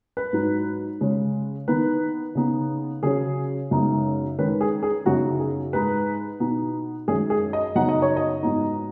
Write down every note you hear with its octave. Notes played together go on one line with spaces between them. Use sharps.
B4
G#2 F#3 D#4
C#3 G#3 C#4
D#3 B3 D#4 B4
C#3 B3 D#4
C#3 F#3 C#4 G#4
F#2 C#3 G#3 B3 D#4
D#3 G#3 C#4 B4
G#4
G#4
F#2 C#3 B3 D#4 F#4
G#4
G#2 G#3 D#4 B4
B2 B3 D#4
F#2 D#3 G#3 C#4 G#4
G#4
D#5
F#2 C#3 F#3 B3 D#4 F#5
D#5
C#5
D#5
G#2 F#3 B3 D#4